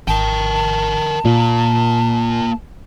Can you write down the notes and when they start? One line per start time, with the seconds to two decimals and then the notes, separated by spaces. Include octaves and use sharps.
0.08 G#1 A#4 G5 A5
1.25 A#2 A#3 F4